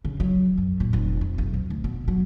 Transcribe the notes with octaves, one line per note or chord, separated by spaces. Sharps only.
C#3
F#3
F#2
A#2
F1
F2
B1
F2
D2
B2
F#3